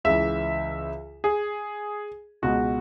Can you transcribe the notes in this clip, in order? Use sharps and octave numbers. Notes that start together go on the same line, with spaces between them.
C#2 C#3 E3 E5
G#4
C#2 B2 G#3 F#4